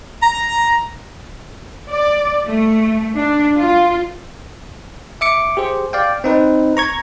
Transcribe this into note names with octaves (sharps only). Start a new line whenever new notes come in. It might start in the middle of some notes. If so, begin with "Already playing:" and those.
A#5
D5
A3
D4
F4
E5 D6 C#7
G4 G#4 C5
D5 F5 G5
C4 D#4 B4
A#5 C#6 G#6